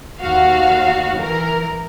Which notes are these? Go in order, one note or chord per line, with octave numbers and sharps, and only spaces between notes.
D#2 F#4 F5
E3 A#4